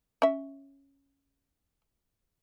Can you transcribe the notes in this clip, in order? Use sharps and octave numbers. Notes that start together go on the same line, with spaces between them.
C#4 E5